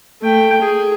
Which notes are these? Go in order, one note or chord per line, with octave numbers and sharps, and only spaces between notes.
A3 G5
G#4